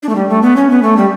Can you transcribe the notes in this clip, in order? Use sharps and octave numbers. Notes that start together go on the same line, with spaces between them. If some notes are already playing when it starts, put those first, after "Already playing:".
D4
A3
G3
A3
B3
C#4
B3
A3
G3